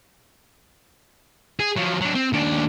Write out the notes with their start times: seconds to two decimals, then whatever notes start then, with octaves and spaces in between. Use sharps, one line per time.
1.60 G#4
1.77 F3 F#3
2.01 F#3 D4
2.15 C4
2.33 D#2 D4